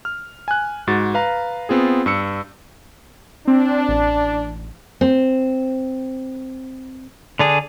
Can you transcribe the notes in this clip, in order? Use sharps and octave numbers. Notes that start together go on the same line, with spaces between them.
F6
G#5 F#6
G#2 F#4 A6
B4 F5 A#5
B3 C4 F4 G#4
G2 E6 C#7
C4 D4
A1
C4
D3 D4 G#4